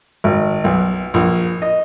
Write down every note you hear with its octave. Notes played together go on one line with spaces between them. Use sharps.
G#1
B1
A#1
D#5